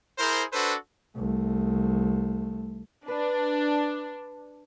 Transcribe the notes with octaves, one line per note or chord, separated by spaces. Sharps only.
E4 G#4 A#4 C5
D4 F#4 A4 B4 C5
C2 A3
D4 B4